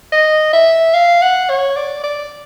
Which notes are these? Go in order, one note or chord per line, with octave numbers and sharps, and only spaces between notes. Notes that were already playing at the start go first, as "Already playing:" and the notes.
D#5
E5
F5
F#5
C#5
D5
D5